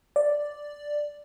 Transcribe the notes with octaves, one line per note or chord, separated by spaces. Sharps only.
D5